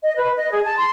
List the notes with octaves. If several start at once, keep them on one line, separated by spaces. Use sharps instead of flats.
D#5
B4
D#5
G#4
A5
C6